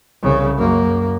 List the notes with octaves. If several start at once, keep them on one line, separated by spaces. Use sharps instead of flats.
C2 C#3
F#2 A#3